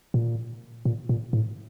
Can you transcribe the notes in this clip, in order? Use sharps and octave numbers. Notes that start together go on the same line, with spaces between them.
A#2
A#2
A#2
A2